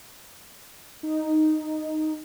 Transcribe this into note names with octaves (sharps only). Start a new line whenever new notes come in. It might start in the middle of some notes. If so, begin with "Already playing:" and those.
D#4